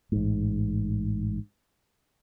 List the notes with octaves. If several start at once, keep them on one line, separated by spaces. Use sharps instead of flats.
A1 G#2